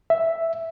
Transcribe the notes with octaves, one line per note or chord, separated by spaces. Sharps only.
E5